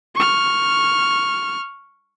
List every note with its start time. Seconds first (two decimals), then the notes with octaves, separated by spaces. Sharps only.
0.16 C#6 F6